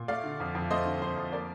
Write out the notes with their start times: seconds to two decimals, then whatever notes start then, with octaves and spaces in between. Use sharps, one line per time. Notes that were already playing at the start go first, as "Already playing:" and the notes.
Already playing: A#2
0.08 A3 D5 F5
0.24 D3
0.40 F2
0.55 F2
0.70 A3 C5 D#5
0.85 D3
1.01 F2 C5
1.17 F2
1.32 A#3 A#4 D5